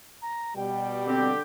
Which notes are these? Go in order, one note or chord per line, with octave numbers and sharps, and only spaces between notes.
A#5
B2 G3 G5
D3 C4 G4